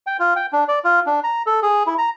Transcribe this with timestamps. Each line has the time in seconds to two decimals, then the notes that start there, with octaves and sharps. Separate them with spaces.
0.07 G5
0.19 F4
0.36 G5
0.53 D4
0.68 D5
0.84 F4
1.06 D4
1.24 A#5
1.46 A4
1.62 G#4
1.86 E4
1.98 A#5